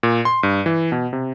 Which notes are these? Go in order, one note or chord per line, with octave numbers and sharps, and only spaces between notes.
A#2
C6
G2
E3
B2
C3